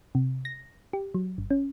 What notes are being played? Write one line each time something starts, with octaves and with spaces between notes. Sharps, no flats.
C3
A#6
G4
F#3
G1
C#4